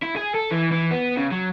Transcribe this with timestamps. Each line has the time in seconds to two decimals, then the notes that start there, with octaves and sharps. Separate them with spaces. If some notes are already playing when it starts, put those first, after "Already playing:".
0.03 E4
0.17 G#4
0.35 A4
0.52 E3
0.72 E3
0.91 B3
1.17 C#3
1.32 F#3